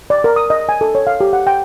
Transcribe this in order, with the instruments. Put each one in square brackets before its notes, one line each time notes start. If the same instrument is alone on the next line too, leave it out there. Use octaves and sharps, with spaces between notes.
[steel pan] D5
A#4
D#6
D#5
G#5
A4
C#5
F5
G4
F#5
G5